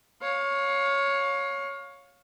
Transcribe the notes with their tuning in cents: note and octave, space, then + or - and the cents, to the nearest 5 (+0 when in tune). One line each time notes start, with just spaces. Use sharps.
C#5 +0 F5 +25